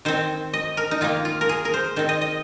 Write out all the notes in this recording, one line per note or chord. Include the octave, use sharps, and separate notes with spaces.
D#3 C4 C5
D#5
A#4
D#4
D#3 A#3 F4
F4
A#4
G#4
A#4
C5
D#3 C4 C5
D#5
D#5